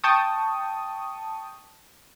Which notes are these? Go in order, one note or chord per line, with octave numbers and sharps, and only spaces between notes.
G5 A5 C#6 D#6